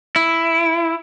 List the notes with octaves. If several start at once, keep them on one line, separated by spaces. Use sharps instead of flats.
E4